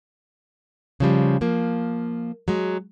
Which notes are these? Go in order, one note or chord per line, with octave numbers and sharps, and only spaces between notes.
C#3 F3 G3
F3 A#3
F#3 G#3